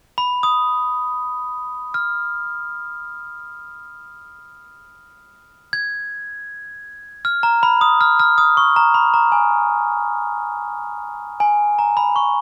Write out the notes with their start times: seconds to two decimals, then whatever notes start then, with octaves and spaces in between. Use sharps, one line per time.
0.18 B5
0.43 D#6
1.94 F6
5.73 G#6
7.25 F6
7.43 A#5
7.63 B5
7.81 D#6
8.01 F6
8.20 F6
8.38 D#6
8.57 C#6
8.76 A#5
8.94 B5
9.14 A#5
9.32 G#5
11.40 G#5
11.79 A#5
11.97 B5
12.16 C#6